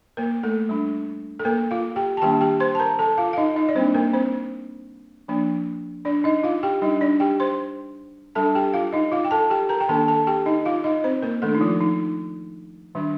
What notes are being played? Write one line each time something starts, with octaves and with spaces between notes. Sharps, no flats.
A#3 A#4
A3 A4
G3 D4
A4
A#3 A#4
F4 F5
G4 G5
A5
D#3 G3 A#3 D4 G4 G5
G4 G5
C5 C6
A5
A#4 A#5
A4 A5
F4 F5
F5
D#4 D#5
D#4 D#5
D5
G3 A#3 C4 D4 C5
A#3 A#4
C4 C5
F3 A#3 D4
D4 D5
D#4 D#5
F4 F5
G4 G5
G3 D4 D#4 D#5
D4 D5
G4 G5
C5 C6
G3 D4 A4 A5
G4 G5
F4 F5
D#4 D#5
F4 F5
G5
A4 A5
G4 G5
A#4 A#5
G5
D#3 A#3 D4 A4 A5
A4 A5
G4 G5
D#4 D#5
F4 F5
D#4 D#5
C4 C5
A#3 A#4
D#3 A3 D4 A4
D#4
F3 F4
D#4
D#3 G3 D4